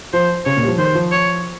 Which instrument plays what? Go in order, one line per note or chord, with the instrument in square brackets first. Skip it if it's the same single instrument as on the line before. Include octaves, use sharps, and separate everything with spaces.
[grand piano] F3 [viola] C5
[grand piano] C#3 [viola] C#5
[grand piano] A#2
G3
F3
[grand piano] D#3 [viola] C5
[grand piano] F3
[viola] C#5